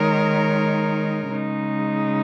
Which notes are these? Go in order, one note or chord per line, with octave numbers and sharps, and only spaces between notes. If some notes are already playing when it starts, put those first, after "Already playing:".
Already playing: D#3 G#3 D#4 A#4 C#5
C#3 G#3 D#4